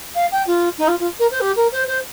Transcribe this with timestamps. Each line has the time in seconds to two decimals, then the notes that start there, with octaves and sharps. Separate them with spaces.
0.14 F5
0.31 G5
0.46 F4
0.78 D#4
0.87 F4
0.99 F4
1.19 A#4
1.30 C5
1.40 G4
1.56 A#4
1.71 C5
1.87 C5